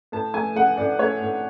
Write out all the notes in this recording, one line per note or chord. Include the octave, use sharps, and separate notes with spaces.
A2 A5
A3 G#5
A3 F#5
A2 D5
A3 C#5
A2